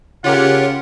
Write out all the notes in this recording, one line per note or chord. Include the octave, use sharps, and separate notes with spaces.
C#3 F4 G4 A#4 C#5 F#5